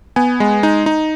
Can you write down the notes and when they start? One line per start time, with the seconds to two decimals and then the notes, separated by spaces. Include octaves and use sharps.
0.16 B3 G#5
0.40 G#3
0.63 D#4
0.86 D#4